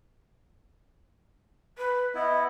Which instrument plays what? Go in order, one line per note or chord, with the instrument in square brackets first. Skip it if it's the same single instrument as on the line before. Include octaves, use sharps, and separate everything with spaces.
[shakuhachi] B4
[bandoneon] B3 E4 [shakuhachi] D#5